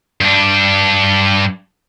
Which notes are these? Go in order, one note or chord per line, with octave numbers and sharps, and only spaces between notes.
G2 D4